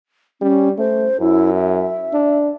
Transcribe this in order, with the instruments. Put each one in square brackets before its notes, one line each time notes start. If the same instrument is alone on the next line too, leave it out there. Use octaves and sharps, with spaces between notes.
[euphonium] G3 [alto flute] C#4
[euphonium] A3 [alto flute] C5
[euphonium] F#2 [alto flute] E4
[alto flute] E5
[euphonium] D4